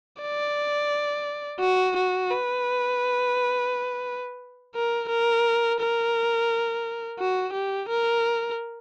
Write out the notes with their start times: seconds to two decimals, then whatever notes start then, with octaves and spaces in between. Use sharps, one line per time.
0.22 D5
1.60 F#4
1.96 F#4
2.30 B4
4.75 A#4
5.09 A#4
5.80 A#4
7.19 F#4
7.53 G4
7.89 A#4